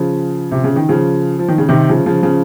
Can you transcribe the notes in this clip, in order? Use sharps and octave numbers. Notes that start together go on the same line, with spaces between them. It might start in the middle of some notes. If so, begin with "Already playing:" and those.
Already playing: C#3 F3
C3
C#3
D#3
C#3 F3
F3
D#3
C#3
C3 D#3
C#3 F3
C#3 F3
C#3 F3